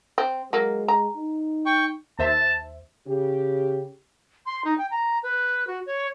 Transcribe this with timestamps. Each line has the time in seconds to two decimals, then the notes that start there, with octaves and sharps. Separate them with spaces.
0.18 C4
0.53 F#3 G#3 A#3
0.88 A#5
1.17 D#4
1.66 G5 C#6
2.19 D#2 C5 E5 A5
3.07 C#3 G4
4.46 C6
4.65 D#4
4.78 G5
4.91 A#5
5.23 B4
5.67 F#4
5.86 C#5